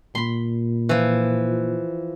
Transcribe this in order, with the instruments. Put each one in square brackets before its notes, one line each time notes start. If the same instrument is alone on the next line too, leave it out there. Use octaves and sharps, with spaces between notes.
[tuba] A#2 [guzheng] B5 C6
[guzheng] E3 F3